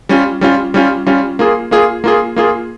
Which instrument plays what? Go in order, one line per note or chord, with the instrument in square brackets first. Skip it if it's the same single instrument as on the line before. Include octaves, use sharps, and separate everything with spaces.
[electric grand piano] G3 C#4 F4
G3 C#4 F4
G3 C#4 F4
G3 C#4 F4
A#3 F4 G#4
A#3 F4 G#4
A#3 F4 G#4
A#3 F4 G#4